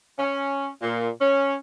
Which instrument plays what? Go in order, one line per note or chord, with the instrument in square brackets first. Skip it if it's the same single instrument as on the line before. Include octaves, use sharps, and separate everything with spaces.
[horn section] C#4
A#2
C#4